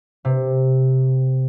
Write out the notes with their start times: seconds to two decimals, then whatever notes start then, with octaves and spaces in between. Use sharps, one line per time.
0.25 C3